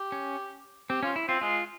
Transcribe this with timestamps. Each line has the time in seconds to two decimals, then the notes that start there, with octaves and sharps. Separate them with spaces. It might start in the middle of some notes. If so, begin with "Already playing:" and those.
Already playing: G4
0.12 C#4
0.90 C4 G4
1.03 C#4 F4
1.16 E4
1.28 C4 F4
1.41 G#3 F4